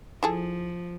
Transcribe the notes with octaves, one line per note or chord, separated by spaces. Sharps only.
F3 E4 G#4 A4